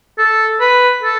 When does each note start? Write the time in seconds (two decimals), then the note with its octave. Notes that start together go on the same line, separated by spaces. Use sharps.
0.18 A4
0.61 B4
1.03 A4